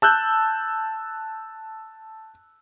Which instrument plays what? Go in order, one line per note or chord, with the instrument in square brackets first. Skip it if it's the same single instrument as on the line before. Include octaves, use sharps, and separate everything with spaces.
[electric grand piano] A5 E6 F#6 G6